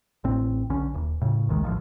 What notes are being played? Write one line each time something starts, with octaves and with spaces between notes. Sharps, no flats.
A1 A2 C4
B1 D3 C#4
D#1
A2 C#3
D#1 A#1 D#3 G#3
A1 D2 G#2 F3